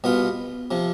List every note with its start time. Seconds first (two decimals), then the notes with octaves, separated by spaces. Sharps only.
0.04 C2 B2 B3 F4
0.71 C3 F3